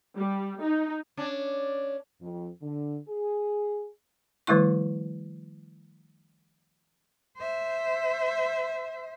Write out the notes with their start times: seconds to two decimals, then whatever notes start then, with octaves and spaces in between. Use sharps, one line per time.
0.16 G3
0.61 D#4
1.17 C#4 D4
2.22 F2
2.62 D3
3.08 G#4
4.47 D#3 F3 G3 A3 E4 C#6
7.38 C5 E5